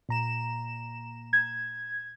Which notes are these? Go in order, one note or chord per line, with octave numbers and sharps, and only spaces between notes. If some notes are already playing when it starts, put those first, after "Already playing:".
A#2 A#5 E7
G#6